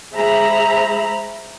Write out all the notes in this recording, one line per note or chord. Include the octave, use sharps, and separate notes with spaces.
G#3 G#4 C5 E5 A#5 B5